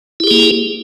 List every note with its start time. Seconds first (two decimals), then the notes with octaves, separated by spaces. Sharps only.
0.20 E4
0.24 G4
0.27 G#4
0.31 A#3